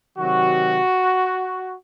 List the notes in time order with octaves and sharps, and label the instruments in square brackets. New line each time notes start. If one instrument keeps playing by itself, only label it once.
[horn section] C3 D#3 F#3 F#4